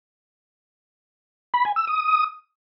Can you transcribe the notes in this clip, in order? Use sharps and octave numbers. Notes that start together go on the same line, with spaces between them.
B5
G#5
E6
D#6